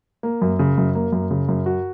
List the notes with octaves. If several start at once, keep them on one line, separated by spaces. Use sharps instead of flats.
A#3
F#2
C#3
F#2
A#3
F#2
C#3
F#2
F#4